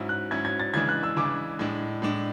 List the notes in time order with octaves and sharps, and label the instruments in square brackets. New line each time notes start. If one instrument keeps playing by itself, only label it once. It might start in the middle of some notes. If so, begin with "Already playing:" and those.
Already playing: [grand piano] G#2 F#3 C#4 E4
[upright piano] F#6
[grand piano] G#2 F#3 C#4 E4 [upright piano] G#6
[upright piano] G#6
A6
[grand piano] C#3 E3 G#3 D4 [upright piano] G#6
[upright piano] F#6
E6
[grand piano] C#3 E3 G#3 D4 [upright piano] D6
[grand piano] A2 G#3 D4
A2 G#3 D4